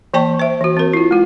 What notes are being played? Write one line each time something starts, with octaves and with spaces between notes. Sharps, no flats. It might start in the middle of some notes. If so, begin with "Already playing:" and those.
E3 A#3 D5 G5 A5 C#6
C5 E5
E3 F#4
C4 A#4
E4 F4
G#3 F4